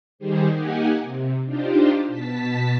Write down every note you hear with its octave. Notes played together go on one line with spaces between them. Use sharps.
D#3 G3 D#4 G4 G#4 C5
A#3 D#4 G4 F#5 G#5
C3
D4 D#4 F4 G4 C5
B2 A5 B6